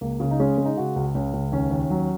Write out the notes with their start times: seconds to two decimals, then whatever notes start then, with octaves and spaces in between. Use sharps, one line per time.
0.01 C#2 A#3
0.20 C#3
0.31 D#4
0.40 G#3 C#4
0.58 G#3
0.65 D#4
0.77 C#3 F#4
0.96 C#2
1.15 C#2 C#4
1.33 C#2
1.52 D#2 C#4
1.71 D#2
1.90 F#3